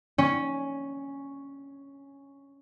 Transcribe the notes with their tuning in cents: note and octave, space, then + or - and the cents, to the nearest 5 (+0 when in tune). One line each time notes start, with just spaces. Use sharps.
C#4 +0